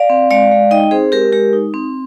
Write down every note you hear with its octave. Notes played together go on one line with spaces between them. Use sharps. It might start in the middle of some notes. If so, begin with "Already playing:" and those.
Already playing: D5 F5
C4
G#3 D5 F5
G#3
D#4 D#5 G5
C4 G#4 C5
G#3 G4 A#4
G#3 G4 A#4
D#4
C4